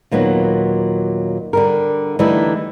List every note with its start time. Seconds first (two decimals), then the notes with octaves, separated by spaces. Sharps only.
0.11 D#2 A#2 F#3 B3
1.53 D3 G3 A#4
2.19 D3 E3 G3 A3 D#4 E4